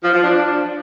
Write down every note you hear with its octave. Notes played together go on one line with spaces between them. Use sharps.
F3
F3
D4